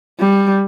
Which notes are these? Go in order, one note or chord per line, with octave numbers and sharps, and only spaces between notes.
G3